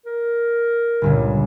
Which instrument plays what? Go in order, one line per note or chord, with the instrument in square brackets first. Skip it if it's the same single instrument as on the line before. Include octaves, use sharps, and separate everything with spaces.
[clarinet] A#4
[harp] G1 C#2 A#2